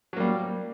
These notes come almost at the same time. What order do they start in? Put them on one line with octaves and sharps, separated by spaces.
F#3 A#3 G3